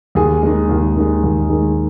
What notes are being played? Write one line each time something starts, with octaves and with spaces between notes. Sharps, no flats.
D#2 G#4
D#3 G#3
D#2
D#3 G#3
D#2
D#3 G#3